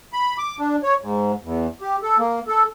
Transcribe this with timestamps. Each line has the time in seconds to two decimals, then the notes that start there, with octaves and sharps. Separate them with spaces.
0.13 B5
0.38 D6
0.59 D4
0.83 C#5
1.01 G#2
1.43 E2
1.81 G4
2.03 A4
2.18 A#3
2.47 A4